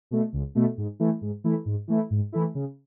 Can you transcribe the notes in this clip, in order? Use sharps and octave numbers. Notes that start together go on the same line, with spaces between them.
B2 A3
C#2
B2 A3
G#2
E3 A3 E4
G#2
E3 A3 E4
G#2
E3 A3 E4
G#2
E3 A3 E4
C#3